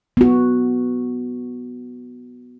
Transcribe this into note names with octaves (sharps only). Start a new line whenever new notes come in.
B3 F#4